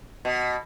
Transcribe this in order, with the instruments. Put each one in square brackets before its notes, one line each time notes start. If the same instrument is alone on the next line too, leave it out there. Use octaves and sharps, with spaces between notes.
[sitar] B2